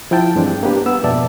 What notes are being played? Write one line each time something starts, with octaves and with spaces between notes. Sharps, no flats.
F3 E4 F5 G5 A5
G2 E3 G#3 C4 D4
A#3 B3 D4 G4 B4
B3 E6
F2 G#2 B2 D5 E5 A5